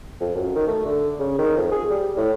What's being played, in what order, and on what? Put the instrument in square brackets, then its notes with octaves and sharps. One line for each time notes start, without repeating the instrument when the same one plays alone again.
[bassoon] F2
F#2
D#3
A3
D3
C#3
D#3
F2
G#4
G3
A2